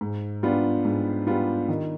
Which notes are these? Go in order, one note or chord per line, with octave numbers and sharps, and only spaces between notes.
G#2
G3 B3 D4 F4
G#2
G3 B3 D4 F4
D#3